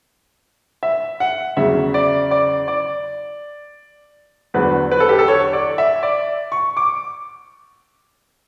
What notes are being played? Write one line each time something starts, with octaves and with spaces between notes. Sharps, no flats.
E5
F#5
E2 C#3 F#3 E5
D5
D5
D5
E2 D3 F#3 B4
B4
A4
G4
A4
C#5
D5
E5
D5
C#6
D6